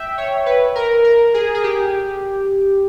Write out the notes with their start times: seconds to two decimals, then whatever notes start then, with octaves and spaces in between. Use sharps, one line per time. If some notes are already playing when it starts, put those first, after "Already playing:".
Already playing: E5 G5
0.18 C#5
0.46 B4
0.75 A#4
1.04 A#4
1.34 G#4
1.54 G#4
1.63 G4